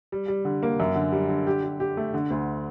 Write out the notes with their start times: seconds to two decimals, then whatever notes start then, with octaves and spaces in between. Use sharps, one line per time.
0.12 G3
0.28 G3
0.45 D3
0.63 A#3
0.80 F#2
0.96 D3
1.12 G3
1.29 D3
1.47 G4
1.64 G4
1.80 G4
1.97 A3
2.14 D3
2.30 D2